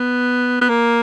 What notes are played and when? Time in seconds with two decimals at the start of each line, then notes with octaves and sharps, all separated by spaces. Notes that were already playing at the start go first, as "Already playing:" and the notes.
Already playing: B3
0.61 B3
0.69 A#3